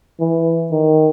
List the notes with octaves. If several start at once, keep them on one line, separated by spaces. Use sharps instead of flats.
E3
D#3